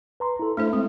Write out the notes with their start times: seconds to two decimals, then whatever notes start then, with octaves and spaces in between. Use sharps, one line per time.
0.20 B4 A#5 C6
0.39 E4 A4
0.57 A3 D4 E4 A4 C5 E5
0.73 G#3 C4